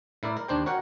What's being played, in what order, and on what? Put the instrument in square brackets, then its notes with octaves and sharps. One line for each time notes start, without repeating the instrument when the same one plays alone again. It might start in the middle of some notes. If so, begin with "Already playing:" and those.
[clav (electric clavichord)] A2 E4 A#4 D5
A#4
D#2 D4 C5 G5
F#4 A#4 C#5 F#5 G5